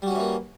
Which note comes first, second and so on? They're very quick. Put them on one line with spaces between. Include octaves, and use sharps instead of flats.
G3 F#4 C#4 E3 A#3